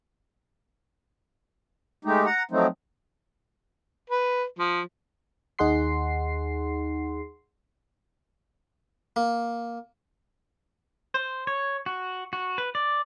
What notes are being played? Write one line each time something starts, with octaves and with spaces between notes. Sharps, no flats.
G#3 A3 D#4 G4
F#5 A#5
F3 F#3 A3 C4 D#4
B4
F3
D#2 D#4 G#4 F#5 C6 C7
A#3
C5
C#5
F#4
F#4
B4
D5